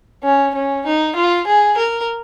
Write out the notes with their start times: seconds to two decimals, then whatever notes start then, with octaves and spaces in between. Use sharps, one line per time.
0.23 C#4
0.54 C#4
0.86 D#4
1.16 F4
1.47 G#4
1.77 A#4